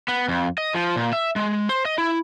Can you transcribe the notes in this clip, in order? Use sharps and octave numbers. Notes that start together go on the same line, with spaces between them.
B3
F2
D#5
F3
A#2
E5
G#3
C5
D#5
E4